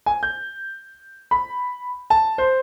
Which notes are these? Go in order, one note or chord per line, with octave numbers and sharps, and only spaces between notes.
G#5
G6
B5
A5
C5